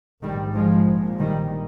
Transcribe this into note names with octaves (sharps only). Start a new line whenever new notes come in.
A#1 G#2 D#3 G3
F3 G#3
A#1 A#2
D#3 G3